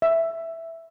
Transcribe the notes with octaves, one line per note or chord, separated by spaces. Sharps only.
E5